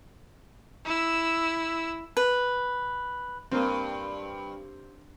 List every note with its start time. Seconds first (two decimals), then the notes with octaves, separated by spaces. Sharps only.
0.85 E4 E6
2.17 B4
3.52 G2 A#3 C4